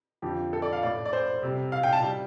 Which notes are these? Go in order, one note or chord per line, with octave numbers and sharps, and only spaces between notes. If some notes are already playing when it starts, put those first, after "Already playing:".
F2 D3 F3 G4
A4
D5
F5
A2 A3 D5
D5
C5
C3 G3
F5
G5
A5
G3